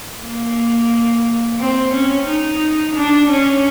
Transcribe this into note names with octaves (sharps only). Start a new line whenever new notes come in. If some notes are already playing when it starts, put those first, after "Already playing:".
A#3
C4
C#4
D#4
D4
C#4